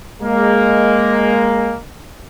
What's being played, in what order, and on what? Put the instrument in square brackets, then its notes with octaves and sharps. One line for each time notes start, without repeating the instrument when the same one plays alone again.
[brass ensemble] G#3 A#3